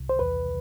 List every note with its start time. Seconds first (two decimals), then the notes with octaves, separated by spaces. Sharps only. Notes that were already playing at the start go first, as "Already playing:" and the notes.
Already playing: C2
0.09 C5
0.19 E2 B4